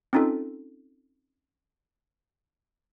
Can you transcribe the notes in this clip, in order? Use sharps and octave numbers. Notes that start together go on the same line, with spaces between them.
C4 C#4 D#4 F4 A4